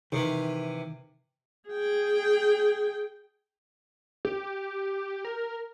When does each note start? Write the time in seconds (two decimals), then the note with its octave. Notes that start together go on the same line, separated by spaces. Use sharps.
0.12 C3 D#3 E3
1.69 G#4 G5
4.25 G4
5.25 A#4